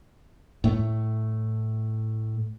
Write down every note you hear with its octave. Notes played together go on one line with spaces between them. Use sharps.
A2 A3